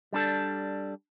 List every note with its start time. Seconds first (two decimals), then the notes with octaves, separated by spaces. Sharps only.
0.13 G3 D4 A4